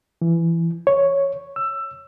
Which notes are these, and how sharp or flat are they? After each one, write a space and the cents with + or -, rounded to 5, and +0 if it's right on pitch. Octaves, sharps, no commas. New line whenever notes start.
E3 +20
C#5 +0
E6 +15